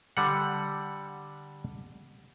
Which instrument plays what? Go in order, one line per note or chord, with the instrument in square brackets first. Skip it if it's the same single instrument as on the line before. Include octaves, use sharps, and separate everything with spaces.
[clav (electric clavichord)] D3 G3 F#5